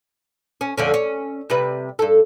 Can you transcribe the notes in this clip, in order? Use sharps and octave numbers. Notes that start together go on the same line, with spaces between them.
C#4
F2 D3 C#4
C#4
C3 G3 B4
G2 A4